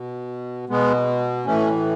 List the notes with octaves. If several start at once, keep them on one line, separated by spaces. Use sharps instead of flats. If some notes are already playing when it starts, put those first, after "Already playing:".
Already playing: B2
B2 G#3 B3
A2 E3 A3 C#4